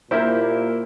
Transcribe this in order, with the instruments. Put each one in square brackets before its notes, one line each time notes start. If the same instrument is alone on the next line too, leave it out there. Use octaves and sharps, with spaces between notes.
[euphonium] A#2 [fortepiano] A#3 E4 C5 [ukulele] G4 A#4